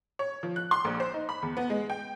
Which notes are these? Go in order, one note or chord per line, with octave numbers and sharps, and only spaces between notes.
C#5
F3
F#6
C6
A#1
C5
D#4
B5
E2
B3
G#3
G5